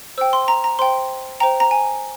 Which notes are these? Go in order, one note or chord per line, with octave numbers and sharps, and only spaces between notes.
C5 G5 E6
C6
A#5
A#5
C5 G5 C6
C5 G5 A#5
A#5
G#5